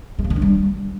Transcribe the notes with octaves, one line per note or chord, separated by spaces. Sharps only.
G#3
A#3
D#3
D4
G3